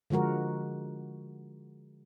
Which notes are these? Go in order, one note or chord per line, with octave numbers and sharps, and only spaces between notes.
D3 F3 G#3 F#4 A#4